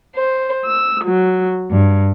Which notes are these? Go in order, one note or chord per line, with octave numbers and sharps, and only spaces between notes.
C5
E6
F#3
G2